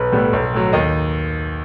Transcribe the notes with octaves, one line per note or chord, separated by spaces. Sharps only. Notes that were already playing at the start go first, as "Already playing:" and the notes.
Already playing: B1 B4
A2 G3 B3
B1
A2 F#3
D#2 D#5